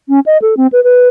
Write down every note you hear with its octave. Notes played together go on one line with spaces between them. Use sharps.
C#4
D#5
A4
C4
B4
B4